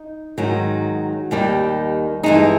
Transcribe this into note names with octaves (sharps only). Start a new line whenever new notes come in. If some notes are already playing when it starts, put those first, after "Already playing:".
Already playing: D#4
G#2 D#3 F#3
D#2 D#3 G3
G2 E3 G#3 D#4